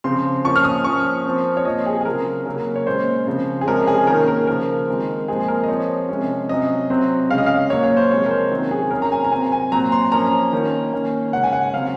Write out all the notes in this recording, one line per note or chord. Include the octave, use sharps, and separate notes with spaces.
C#3 F3 C4 C6
F3 A#3 C#4 C#6
F6
D#6
F3 A#3 C#4 C#6
F3 C4
C#5
A#2 F3 C4 D#5
G#4
G#4
C#3 F#3 C4 A#4
C#3 F#3 A#3 C#4
C#5
A#2 G#3 C#4 C5
C#3 F3 C4
G#4
C3 F3 G#3 C#4 A#4
G#4
D#3 A#3 C#4 A#4
A#4
C#3 F3 A#3 A#4
D#3 G#3 C4
A#2 F3 G#3 C4 G#4
A#4
D#5
F3 C4 C#5
C3 F3 G#3 C#4
C3 F#3 C#4 D#5
C3 F#3 C4
C#3 G#3 C#4 F5
D#5
F5
A#2 F#3 A#3 C#4 C#5
C#5
C5
C3 F3 G#3 C#5
A#4
C5
C3 D#3 F#3 C#4
G#4
C3 F#3 C#4 A#4
A#5
G#5
A#5
C3 F#3 C4 G#5
G#5
A#2 F#3 C4 A#5
C6
F3 A#3 C#4 A#5
D#3 A#3 C#4
D#3 A#3 C#4
C#3 G#3 C#4 F#5
G#5
F#5
C#3 F#3 C4 F5